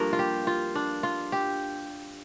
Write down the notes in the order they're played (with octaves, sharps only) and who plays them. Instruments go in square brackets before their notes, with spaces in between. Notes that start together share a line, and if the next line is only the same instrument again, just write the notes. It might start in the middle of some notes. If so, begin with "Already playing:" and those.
Already playing: [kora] G2 F3 A#3 D4 A#4
F4
G4
F4
D4
F4
G4